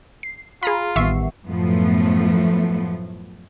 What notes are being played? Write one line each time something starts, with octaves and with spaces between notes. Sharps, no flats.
C7
F4 G#4 A#5 B5
A1 D#3 G3 B3 E5 C#6 C7
F#2 A2 F3 A3 B3